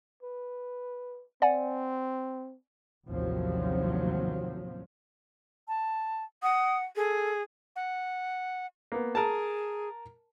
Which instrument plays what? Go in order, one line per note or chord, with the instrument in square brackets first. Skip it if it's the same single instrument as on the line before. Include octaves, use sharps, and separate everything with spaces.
[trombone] B4
[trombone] C4 [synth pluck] D5 F#5 G#5
[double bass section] A1 D#2 C3 F3 F#3
[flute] A5
[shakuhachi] F#5 [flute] D#6
[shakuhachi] G#4 [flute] A4
[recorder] F#5
[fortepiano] A#3 B3
[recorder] G#4 [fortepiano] A#4 A5